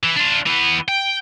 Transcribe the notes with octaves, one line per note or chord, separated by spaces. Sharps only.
E3
D4 F4
E3 B3
G5